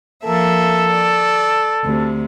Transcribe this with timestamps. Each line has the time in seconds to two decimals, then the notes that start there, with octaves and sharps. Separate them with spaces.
0.24 F3 A#3 A4 E5
0.89 D5
1.83 D2 C3